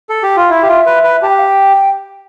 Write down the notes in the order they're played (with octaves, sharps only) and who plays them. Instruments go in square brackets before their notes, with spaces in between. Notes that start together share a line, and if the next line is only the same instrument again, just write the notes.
[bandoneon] A4
G4
F4
[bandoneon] E4 [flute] E5
[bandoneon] G4
F4
B4
B4
[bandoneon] G4 [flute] A5
[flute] G5
F5
G5